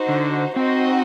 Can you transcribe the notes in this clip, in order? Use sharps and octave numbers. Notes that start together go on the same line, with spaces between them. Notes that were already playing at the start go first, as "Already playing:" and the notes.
Already playing: D#4 F#4 C5
D3
C4 D#4 F#4 C5 D#5